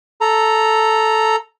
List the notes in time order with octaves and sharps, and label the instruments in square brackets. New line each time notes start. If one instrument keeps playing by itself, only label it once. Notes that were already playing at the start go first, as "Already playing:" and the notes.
[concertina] A4 A#5